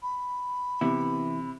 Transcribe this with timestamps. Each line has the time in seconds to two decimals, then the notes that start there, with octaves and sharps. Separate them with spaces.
0.02 B5
0.81 C3 E3 B3 E4